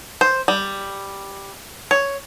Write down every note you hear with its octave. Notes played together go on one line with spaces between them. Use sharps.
C5
G3
C#5